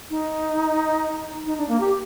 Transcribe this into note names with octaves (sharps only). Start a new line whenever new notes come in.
D#4
D#4
D4
A#3
G4